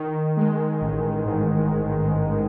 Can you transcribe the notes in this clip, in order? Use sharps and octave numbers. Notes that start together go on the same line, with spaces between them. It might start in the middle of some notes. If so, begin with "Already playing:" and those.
Already playing: D#3
G#3
A1
G#2